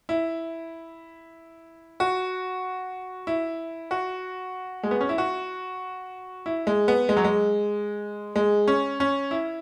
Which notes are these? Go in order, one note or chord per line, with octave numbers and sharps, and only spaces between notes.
E4
F#4
E4
F#4
G#3
B3
C#4
E4
F#4
E4
G#3
B3
G#3
F#3
G#3
G#3
C#4
C#4
E4